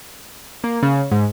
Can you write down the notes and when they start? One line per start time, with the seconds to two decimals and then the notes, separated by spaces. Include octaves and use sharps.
0.64 A#3
0.83 C#3
1.11 G#2